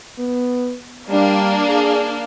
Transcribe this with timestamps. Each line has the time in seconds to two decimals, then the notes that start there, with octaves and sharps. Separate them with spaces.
0.19 B3
1.09 G3 A#3 D4 F5
1.69 G#4